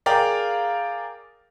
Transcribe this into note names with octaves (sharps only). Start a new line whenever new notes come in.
G#4 A#4 D5 F5 G5